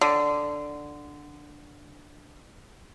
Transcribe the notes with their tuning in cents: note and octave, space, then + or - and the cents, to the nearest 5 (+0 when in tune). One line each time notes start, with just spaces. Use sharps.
D3 +5